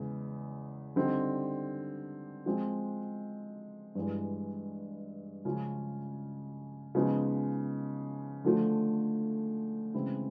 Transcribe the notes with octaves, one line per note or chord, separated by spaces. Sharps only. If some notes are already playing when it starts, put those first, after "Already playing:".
Already playing: E2 C#3 G#3 C#4
D3 G3 C4 D#4
F3 G#3 C4
G2 E3 G#3
C#3 F3 G#3 C#4
C#3 F3 G#3 B3 D#4
D3 F3 A3
C#3 E3 G#3 C4 E4